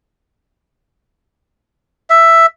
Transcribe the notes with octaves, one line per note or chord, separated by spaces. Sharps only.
E5